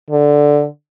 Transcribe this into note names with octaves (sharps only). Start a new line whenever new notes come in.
D3